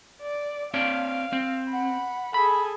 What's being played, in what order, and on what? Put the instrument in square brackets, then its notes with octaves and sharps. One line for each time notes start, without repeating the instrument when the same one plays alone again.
[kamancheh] D5
[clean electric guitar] C4 C#5 D5 [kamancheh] F5
[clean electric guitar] C4
[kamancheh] F#5 B5
[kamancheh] G#4 A4 [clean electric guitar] B5